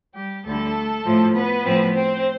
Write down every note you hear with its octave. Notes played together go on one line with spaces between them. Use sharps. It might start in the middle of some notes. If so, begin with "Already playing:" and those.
G3 G4
D2 D3 G3 A3 A4
A2 F3 A3
B3 B4
A2 F3 C4
C4 C5